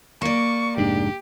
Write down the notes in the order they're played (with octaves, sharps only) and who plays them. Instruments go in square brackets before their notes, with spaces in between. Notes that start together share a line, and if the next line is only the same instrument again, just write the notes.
[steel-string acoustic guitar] A#3 D5 [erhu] C#6
[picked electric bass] F1 G#2 D4 [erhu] G4